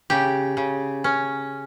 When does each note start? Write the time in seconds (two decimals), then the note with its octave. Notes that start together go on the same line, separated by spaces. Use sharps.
0.10 C#3 G4
0.57 C#3
1.04 C#4